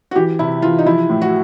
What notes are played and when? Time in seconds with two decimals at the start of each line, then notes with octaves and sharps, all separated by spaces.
0.11 F#4
0.15 E3 G4
0.39 C3 E4
0.62 E3 F4
0.79 D#4
0.86 F3 E4
1.10 A2
1.21 F#4